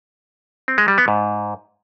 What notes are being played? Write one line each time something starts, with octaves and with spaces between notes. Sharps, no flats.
C4
G#3
G3
B3
G#2